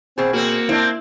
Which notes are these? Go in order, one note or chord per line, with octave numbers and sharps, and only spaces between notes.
B2 C4 G#4
A#3 C4 F#4
C4 D4 E4